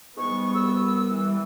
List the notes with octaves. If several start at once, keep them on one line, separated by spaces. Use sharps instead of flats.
E2 G#2 G3 B3 C#6
C2 E6
E3 G3